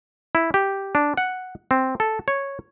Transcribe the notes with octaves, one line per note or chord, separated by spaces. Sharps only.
E4
G4
D4
F#5
C4
A4
C#5